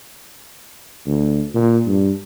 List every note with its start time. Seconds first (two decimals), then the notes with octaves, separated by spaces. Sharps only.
1.06 D2
1.55 A#2
1.86 G2